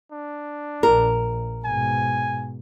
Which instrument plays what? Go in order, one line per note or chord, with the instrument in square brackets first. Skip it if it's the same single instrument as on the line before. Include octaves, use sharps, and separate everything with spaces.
[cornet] D4
[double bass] A#1 [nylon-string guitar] A#4
[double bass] G#2 B2 [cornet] G#5